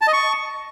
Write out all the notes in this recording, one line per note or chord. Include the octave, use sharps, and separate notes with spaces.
A5
D#5
C#6